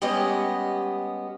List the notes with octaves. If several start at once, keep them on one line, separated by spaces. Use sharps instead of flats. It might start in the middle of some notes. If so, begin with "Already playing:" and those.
G3 G#3 B3 C#4 G4 D#5